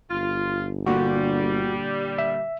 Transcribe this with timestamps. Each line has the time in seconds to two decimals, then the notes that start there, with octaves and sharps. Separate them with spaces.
0.10 G1 F4
0.86 A#2 D3 G3 F#4
2.18 E5